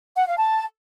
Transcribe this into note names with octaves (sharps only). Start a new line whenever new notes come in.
F#5
F5
A5